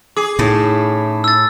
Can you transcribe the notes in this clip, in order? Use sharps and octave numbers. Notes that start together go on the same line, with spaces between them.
G#4 D6 C7
A2 D#3 C#4 E4
E6 A6